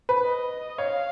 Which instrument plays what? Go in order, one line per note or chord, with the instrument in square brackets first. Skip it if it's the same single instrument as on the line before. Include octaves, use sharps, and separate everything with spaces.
[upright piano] B4
[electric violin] D#5
[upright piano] C#5 [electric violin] F5